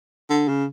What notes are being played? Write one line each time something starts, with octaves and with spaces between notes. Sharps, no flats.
D3
C#3